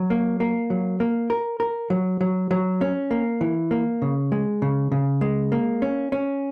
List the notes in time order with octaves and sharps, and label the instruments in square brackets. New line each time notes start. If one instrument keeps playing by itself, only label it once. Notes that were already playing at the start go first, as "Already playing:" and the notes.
Already playing: [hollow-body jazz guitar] F#3
A#3
A#3
F#3
A#3
A#4
A#4
F#3
F#3
F#3
C#4
A#3
E3
A#3
C#3
G#3
C#3
C#3
G#3
A#3
C#4
C#4